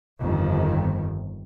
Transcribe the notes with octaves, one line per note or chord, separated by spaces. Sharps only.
G1 F2 D#3